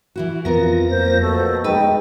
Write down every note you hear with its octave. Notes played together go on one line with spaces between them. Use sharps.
E3 E4 F#4
F2 B3 F4 A#4 A#6
A#3 C5
B2 A3
G#3 D#4 B4 G5